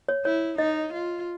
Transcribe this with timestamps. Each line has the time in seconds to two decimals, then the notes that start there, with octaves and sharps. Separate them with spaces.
0.08 C#5
0.24 E4 C#5
0.58 D#4 D#5
0.92 F4